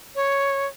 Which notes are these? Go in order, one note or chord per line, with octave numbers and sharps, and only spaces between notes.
C#5